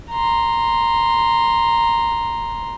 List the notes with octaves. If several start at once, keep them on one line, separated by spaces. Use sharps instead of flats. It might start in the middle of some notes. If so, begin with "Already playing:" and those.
A#5 C6